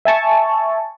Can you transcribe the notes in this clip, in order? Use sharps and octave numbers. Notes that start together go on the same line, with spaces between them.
E5 G#5 A5 C#6